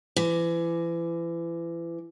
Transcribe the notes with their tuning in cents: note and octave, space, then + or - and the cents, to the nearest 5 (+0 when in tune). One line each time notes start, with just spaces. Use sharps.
E3 +30